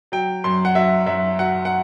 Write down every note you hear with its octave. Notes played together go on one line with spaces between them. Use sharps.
F#3 G5
F#2 C6
F#5
F#3 E5
F#2 E5
F#3 F#5
F#5